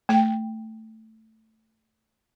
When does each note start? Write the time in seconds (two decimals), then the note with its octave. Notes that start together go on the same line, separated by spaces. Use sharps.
0.09 A3 G5